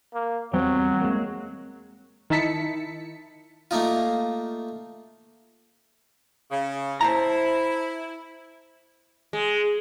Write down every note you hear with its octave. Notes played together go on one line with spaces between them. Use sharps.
A#3
E2 F#3 G3 C4 G5
G#3 A#3
D#3 D#4 E4 A5 B6 C#7
A3 A#3 D#4 F4
C#3
E4 C5 A5 A#5
G#3